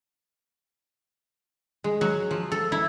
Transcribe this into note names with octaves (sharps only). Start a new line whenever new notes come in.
G#3
F#3
F3
A4
E4